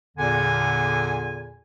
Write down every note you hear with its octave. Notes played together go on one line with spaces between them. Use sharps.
E2 A#2 D3 G#5